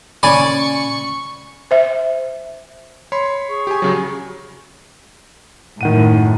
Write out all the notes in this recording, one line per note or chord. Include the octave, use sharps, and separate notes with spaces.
A#2 C#3 C#4 D5 G#5 B5 C#6
C5 E5
C#5 B5 C6
G#4 C#6
G4 G#5
C#3 F#3
F#2 A2 D#3 F#5 D#7